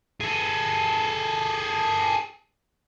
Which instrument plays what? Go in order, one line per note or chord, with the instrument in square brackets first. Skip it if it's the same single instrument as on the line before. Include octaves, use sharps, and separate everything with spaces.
[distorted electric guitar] G#4 A4